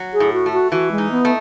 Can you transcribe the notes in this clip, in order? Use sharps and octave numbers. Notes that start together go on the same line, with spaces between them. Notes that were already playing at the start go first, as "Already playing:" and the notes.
Already playing: F#3
G#4
A2
F#4
A3
F#4
E3 F#4
G#3
D#4
B3
A3